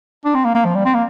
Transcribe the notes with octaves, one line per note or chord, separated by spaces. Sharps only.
D4
C4
A#3
A#3
F3
G3
C4
A#3